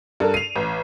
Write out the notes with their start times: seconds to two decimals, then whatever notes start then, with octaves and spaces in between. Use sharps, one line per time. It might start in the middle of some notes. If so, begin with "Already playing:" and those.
0.20 G2 A4 A#4
0.34 C7 D#7 F7
0.56 A1